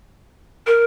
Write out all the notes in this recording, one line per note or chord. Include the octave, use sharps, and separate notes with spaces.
A#4